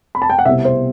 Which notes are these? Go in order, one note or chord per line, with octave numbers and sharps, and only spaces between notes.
B5
A5
G5
F#5
C2 B2 G3 C4 E5
C5